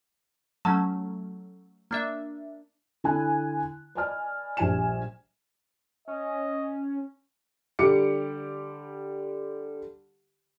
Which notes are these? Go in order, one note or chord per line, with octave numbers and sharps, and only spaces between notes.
F#3 A3 C#4 A5
A#3 D4 E5
D3 E4 G#5 F#6
B4 D5 D#5 G#5 A5 F6
A#1 G3 G#5 E7
C#4 D#5
D3 G3 G4 D6 C#7